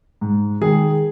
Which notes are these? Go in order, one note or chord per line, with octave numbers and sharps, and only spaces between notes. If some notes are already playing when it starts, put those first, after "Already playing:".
G#2
D#3 G#3 G#4